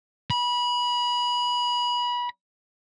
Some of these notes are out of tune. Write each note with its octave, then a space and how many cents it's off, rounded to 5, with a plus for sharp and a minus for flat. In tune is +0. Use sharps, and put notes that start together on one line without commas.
B5 -25